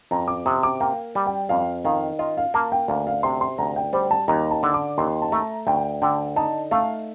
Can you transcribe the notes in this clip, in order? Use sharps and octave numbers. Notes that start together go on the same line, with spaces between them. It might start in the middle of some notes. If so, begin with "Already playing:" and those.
F2 A#5
D6
C3 D#6
D6
A#3 G5
G3
G5
F2 F5
D#3 F5
F4 D#5
F5
A#3 A5
G5
D2 F5
F5
C3 C6
C6
D2 A#5
G5
G3 C5
A5
D#2 A#5
A5
D3
D6
D#2 C6
A5
A3 A#5
D2 G5
D3 G5
D#4 A5
A3 F5